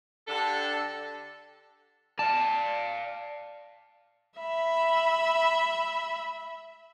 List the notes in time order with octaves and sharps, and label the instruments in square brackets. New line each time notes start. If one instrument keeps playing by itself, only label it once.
[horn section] D3 D4 G4 A4
[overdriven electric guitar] D5 F5 [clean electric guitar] A5
[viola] E5 B5